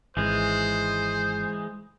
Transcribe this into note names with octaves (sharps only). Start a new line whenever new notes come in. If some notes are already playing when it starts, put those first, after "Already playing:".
G#1 E3 G#3 C5